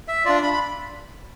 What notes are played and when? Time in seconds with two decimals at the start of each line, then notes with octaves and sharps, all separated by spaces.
0.08 E5
0.25 D4 F4 D5
0.43 B5
0.54 B5